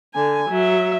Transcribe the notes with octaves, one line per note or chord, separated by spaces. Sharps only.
D3 G#5
F#3 E5